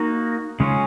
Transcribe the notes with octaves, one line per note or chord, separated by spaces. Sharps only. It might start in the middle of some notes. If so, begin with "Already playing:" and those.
Already playing: A#3 D#4 F#4
C#3 G#3 C#4 F4